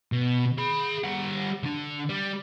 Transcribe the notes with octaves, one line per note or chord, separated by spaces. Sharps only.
B2
G#4 B5
G3 F#5
D3 D4
G3